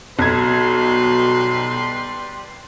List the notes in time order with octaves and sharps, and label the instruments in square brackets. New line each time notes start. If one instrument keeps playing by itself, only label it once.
[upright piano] B1 G#6 [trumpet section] G3 B4 C6 [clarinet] F#4